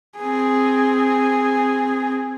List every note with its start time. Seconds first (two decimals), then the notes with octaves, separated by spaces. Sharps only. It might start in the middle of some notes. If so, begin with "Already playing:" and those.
0.18 C4 G#4